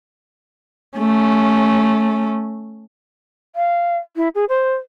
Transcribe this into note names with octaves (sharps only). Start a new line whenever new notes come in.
A3 C#4
F5
E4
G#4
C5